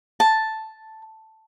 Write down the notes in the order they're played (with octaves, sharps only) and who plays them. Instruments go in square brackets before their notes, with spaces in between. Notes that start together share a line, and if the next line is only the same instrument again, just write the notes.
[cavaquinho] A5